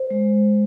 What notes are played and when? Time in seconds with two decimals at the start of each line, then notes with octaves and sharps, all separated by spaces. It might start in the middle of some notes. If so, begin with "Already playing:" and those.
Already playing: C5
0.11 G#3